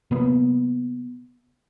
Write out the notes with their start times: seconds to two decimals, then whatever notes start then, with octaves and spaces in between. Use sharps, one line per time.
0.11 C3 F#3 A#3 B3